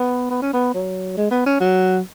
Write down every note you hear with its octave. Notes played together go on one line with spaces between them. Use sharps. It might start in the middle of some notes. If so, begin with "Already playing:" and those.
Already playing: B3
B3
C#4
B3
F#3
G#3
B3
C#4
F#3